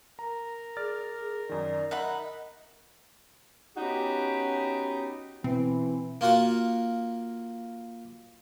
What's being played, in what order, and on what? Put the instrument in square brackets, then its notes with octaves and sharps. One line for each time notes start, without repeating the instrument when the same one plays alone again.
[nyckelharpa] A#4 [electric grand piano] A#5
[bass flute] G#4 [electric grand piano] D5 F6 A6
[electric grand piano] F#2 D#3 [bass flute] D5
[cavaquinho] D#4 F#5 B5 [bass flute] D#5 [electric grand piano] E5
[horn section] B3 C#4 D#4 F#4 G4
[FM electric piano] B2 [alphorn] E3 [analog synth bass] C4
[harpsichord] A#3 F4 F#4 F#5